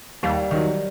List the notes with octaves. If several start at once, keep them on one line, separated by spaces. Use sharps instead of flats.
D#2 G3
D#3 F#3